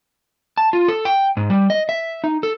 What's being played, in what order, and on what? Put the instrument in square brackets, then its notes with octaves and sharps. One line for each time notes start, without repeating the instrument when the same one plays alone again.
[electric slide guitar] A5
F4
A4
G5
G#2
G3
D#5
E5
D#4
A4